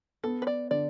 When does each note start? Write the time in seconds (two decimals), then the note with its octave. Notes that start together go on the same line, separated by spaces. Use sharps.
0.23 B3 A4
0.42 B4
0.47 D5
0.71 D3 D5